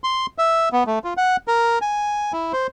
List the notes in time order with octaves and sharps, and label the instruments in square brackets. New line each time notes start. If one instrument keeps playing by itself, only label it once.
[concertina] C6
E5
B3
A3
F4
F#5
A#4
G#5
E4
C5